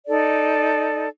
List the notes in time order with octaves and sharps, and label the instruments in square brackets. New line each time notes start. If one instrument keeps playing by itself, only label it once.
[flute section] D#4 A4 D5